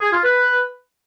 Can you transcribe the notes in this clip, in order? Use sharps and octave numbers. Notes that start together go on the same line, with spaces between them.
G#4
F4
B4